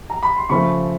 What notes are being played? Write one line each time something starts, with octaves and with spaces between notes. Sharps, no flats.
A#5
B5
C6
C#3 F3 A3 B5 C#6